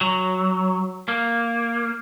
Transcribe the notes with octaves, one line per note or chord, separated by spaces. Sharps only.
F#3
A#3